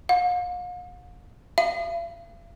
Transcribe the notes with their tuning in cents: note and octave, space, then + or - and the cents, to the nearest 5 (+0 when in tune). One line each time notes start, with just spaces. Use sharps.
F5 +45
F5 -45